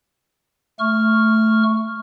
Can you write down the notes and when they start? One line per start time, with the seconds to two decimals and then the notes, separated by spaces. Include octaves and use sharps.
0.79 A3 C#6 F6